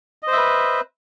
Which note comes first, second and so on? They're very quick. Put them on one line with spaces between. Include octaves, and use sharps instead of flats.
D#5 C5 E5 B4